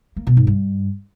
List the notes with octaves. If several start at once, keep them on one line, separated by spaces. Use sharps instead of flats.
A#3
B2
G#2
G2